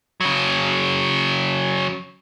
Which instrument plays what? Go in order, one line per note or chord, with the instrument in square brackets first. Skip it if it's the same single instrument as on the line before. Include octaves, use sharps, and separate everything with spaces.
[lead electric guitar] C#3 F#3